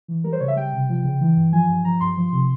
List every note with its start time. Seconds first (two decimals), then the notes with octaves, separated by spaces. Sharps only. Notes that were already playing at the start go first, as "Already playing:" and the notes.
0.08 E3
0.24 G3 A#4
0.33 C5
0.40 C#3 C#5
0.48 E5
0.56 G3 G5
0.73 C3
0.89 F3
1.04 C#3
1.21 E3
1.37 G2
1.53 F3 G#5
1.69 G2
1.85 F3 A#5
2.00 G2 C6
2.17 F3
2.33 C3